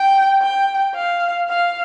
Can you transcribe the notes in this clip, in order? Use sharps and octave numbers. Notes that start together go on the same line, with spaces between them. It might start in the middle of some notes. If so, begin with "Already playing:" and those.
Already playing: G5
G5
F5
F5